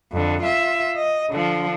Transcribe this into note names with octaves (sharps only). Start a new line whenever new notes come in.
F2 D3
F4 E5
D#5
D3 F3